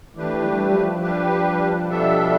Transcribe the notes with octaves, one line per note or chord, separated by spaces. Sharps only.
E3 A3 D4 G4 B4
G3
F3
G3 D4 G4 B4
B2 G3 D4 A4 E5